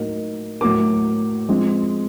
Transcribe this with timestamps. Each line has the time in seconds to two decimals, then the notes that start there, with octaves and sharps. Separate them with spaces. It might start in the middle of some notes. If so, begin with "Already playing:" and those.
Already playing: A2 F#3 A#3 D#4
0.61 A2 F#3 A#3 D6
1.49 F3 G#3 C4